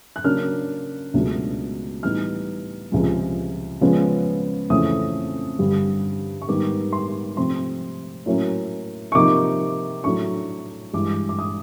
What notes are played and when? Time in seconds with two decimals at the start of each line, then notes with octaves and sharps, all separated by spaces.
0.16 F#6
0.24 C#3 F#3 A#3 D4 F6
1.14 C#2 B2 F#3 A3 D4
2.03 A2 E3 G3 B3 D#4 F6
2.92 C#2 C3 F3 G#3
3.81 C#3 F3 G#3 B3
4.70 F2 C#3 E3 A3 D#6
5.59 G2 D3 G3
6.42 C#6
6.48 G#2 D#3 G3 B3 D6
6.93 C6
7.37 C3 F3 A3 C4 C6
8.26 A2 F#3 A#3 C#4
9.12 C#6
9.15 C3 F3 A#3 D#4 D6
10.04 A2 F#3 A3 D4 C#6
10.93 G2 E3 G#3 D6
11.29 D6
11.39 D#6